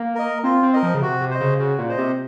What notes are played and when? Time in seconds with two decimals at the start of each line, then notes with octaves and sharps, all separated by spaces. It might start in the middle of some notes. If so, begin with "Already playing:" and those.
Already playing: A#3
0.15 A#4 D#5
0.44 C4 F4
0.63 C4
0.73 A#4 D#5
0.83 F3
0.94 C#3
1.02 C3 F#4
1.21 C3
1.31 C5 D#5
1.41 C#3
1.59 C#3 F#4
1.79 A#2
1.89 C5 D#5
1.98 C3